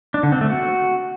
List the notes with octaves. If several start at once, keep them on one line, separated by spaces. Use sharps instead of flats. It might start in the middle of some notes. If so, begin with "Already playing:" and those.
D4
D3
C4
A3
F#4